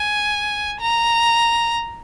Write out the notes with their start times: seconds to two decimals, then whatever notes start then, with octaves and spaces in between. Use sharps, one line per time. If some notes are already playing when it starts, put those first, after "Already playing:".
Already playing: G#5
0.81 A#5